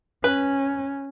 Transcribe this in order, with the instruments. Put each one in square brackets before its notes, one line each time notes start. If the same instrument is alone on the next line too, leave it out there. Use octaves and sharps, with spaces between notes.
[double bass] C#4 [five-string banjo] B4